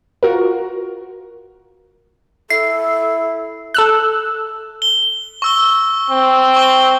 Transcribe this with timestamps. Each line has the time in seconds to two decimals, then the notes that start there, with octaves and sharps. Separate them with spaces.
0.23 F4 F#4 A#4
2.50 E4 A4 C7
3.74 A4 E6 F#6
4.82 G7
5.42 C#6 E6 G7
6.10 C4
6.56 C#6 G7